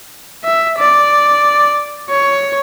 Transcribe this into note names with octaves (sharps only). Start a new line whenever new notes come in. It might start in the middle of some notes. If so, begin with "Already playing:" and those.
E5
D5
C#5